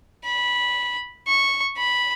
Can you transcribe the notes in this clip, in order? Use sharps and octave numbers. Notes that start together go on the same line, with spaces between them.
B5
C#6
B5